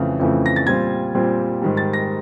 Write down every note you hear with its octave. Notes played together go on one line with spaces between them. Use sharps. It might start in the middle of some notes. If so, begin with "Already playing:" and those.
Already playing: F2 C#3 E3 A3
F2 C#3 E3 A3
A#6
A6
A#2 G3 C4 F4 G#6
A#2 G3 C4 F4
G#2 D#3 G3
A6
A#6